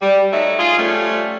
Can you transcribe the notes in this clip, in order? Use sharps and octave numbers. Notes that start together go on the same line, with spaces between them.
G3
F#3 A3 D#4 E5
F4 G#4
F3 G3 A3 C#4